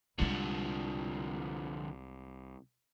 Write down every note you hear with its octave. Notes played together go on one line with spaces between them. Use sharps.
C2 D3 F3 G3 G#3